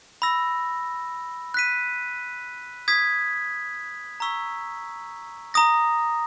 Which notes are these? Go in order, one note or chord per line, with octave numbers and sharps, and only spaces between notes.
B5 E6 A#6
F#6 B6 D#7
D#6 G#6 B6
A#5 C#6 E6 B6
A#5 D#6 A#6